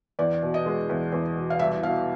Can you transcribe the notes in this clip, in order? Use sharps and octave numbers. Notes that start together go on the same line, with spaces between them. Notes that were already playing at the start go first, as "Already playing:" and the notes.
E2 D5
B2
D#5
G#3
E2
E2
B2
F5
C2 E5
B2 F5